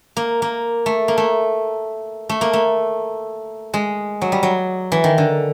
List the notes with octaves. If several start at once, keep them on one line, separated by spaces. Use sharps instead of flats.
A#3
A#3
A3
A#3
A3
A3
A#3
A3
G#3
F#3
G3
F#3
E3
D#3
D3